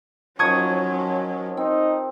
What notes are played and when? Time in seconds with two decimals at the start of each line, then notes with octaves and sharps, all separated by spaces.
0.39 D#3 F3 F#3 C#4 C#6 D#6 G#6
1.57 C4 D#4